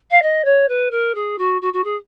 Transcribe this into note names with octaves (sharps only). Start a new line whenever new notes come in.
F5
D#5
C#5
B4
A#4
G#4
F#4
F#4
F#4
G#4